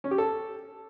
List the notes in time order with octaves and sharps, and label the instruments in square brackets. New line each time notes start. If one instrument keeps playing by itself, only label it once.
[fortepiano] C#4
G4
A4